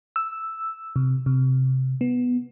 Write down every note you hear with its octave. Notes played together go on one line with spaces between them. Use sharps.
E6
C3
C3
B3